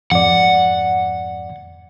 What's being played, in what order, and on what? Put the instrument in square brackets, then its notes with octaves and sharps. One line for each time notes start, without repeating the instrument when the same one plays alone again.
[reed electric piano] F2 G#2 D5 [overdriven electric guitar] F#5